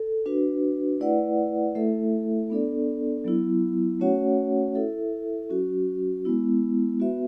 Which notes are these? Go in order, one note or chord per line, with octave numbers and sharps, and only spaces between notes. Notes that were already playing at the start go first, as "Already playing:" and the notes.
Already playing: A4
D4 F#4 B4
A3 E4 B4 D5 F#5
A3 E4 A4 E5
B3 D4 A4 D5
F#3 B3 E4
A3 C#4 F#4 C#5 F#5
E4 A4 E5
F#3 C#4 F#4
G#3 B3 E4
B3 F#4 B4 E5